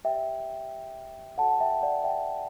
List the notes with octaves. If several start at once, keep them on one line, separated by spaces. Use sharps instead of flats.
G4 B4 D5 E5 G5
F#4 A4 D5 F#5 A5
E5 G5
D5 F#5
E5 G5